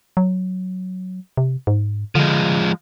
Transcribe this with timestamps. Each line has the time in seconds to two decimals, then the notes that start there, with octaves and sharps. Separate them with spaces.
0.17 F#3
1.37 C3
1.67 G#2
2.15 D3 F3 G#3